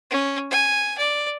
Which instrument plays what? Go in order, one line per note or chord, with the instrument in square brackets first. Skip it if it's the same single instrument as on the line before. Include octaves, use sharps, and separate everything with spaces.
[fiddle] C#4
G#5
D5